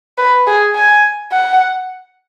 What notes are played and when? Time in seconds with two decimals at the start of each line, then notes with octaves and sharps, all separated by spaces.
0.18 B4
0.47 G#4
0.75 G#5
1.32 F#5